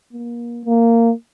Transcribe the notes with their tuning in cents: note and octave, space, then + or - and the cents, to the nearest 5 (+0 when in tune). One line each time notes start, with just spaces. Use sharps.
A#3 +30
A#3 -15